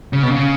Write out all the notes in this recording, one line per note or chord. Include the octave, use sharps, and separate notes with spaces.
C#3
B2
C#3